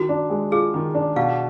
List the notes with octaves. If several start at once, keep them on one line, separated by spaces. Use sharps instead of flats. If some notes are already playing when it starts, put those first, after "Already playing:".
Already playing: D#3 F#4
D4
G#3
F4 G#4
D#3
D4
B2 F5